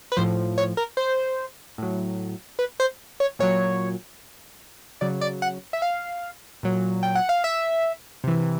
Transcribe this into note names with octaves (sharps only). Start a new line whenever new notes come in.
B4
A2 F3 C5
C#5
A#4
C5
A2 F#3
B4
C5
C#5
A#2 F#3 C#5
C#3 F#3 D5
D5
F#5
E5
F5
A#2 F#3
G5
F#5
F5
E5
C3 E3